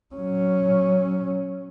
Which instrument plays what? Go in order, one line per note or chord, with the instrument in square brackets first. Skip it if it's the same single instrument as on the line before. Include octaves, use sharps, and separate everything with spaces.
[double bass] F#3 C#4